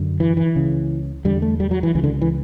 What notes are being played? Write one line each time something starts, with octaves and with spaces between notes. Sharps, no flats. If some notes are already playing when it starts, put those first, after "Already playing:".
Already playing: F#2 D3
E3
E3
C#2 C#3
E2 D3 G3
A3
G3
F#3
E3
C#2 C#3 E3
D3
E3